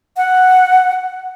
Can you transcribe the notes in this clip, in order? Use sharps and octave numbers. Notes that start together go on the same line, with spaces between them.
F#5